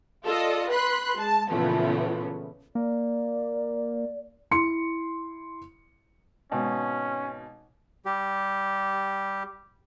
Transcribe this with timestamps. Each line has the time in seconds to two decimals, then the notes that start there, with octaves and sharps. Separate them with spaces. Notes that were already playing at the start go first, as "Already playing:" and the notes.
0.25 F4 A4 D5 D#5
0.70 B4 B5 C6 F#6
1.18 G#3 A5
1.49 A#2 C#3 E3 F3 A3 B3
2.75 A#3 D5
4.51 E4 C6 C#7
6.52 G#1 B2 C#4
8.05 G3 G4